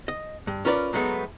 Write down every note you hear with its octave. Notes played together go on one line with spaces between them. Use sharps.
D#5
G2
C#4 F4 A#4 B4 C#5 D5
F#3 G#3 A3 B3 D#4